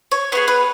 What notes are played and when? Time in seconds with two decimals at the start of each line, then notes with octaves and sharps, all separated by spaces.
0.11 C#5
0.32 B3 D#4 G#4 C#5
0.48 B4